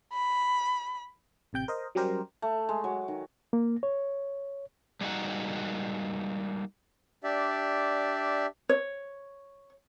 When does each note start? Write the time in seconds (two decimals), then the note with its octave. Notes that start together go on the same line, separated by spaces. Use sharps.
0.13 B5
1.53 A1 C3 G5 G6
1.68 A#4 C5 D#5
1.95 F#3 G3 C#4 G4 A#4 C5
2.42 A3
2.69 G#3
2.84 F#3
3.08 D#3
3.53 A#3
3.83 C#5
5.01 G3 G#3 A#3 D#4 F#4 F#5
7.24 D4 G4 D5 E5
8.69 C#5